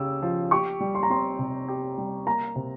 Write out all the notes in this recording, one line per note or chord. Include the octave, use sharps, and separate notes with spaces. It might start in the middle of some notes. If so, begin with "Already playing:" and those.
Already playing: C#3 G4 E6
F3
G4 C#6
G3
C6
A#5
C4 C6
C3
G4
G3
A#3 A#5
C3